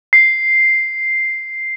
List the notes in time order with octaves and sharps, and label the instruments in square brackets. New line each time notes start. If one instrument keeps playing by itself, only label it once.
[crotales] C7